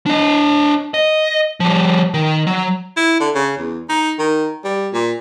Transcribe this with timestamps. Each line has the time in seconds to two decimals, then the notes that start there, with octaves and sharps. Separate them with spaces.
0.06 D4 D#5
0.94 D#5
1.60 F3 G3
2.14 D#3
2.47 F#3
2.97 E4
3.20 D3
3.35 C#3
3.58 E2
3.89 D#4
4.19 D#3
4.64 G3
4.93 A#2